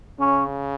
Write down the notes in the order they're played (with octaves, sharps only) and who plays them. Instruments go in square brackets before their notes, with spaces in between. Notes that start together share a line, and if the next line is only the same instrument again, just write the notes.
[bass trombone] C#3 [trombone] C#4